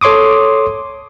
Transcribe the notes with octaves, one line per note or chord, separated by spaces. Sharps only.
A4 C#5 C6 D6 D#6